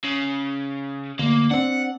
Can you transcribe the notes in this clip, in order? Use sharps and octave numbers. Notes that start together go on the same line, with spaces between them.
C#3
D2 A#3
C4 D4 F#5